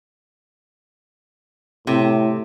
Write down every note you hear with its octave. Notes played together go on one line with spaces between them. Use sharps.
A2 C3